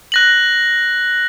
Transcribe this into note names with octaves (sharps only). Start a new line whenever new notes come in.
F#6 A#6 F#7